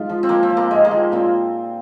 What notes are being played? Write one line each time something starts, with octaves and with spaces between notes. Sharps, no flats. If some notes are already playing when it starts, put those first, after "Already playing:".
Already playing: G#2 F4
F3
C4
F3 A#3
C4
F3
A#3
G#2 G#3
A#3
F3
A#2 C4